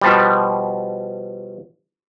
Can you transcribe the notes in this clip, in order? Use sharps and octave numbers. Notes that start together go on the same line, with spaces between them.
B2 F3 G3